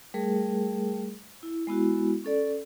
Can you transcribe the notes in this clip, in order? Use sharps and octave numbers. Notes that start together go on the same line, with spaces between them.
G3 A3 G#4 A#4
E4
G#3 B3 E4 F#4
C#4 A4 D5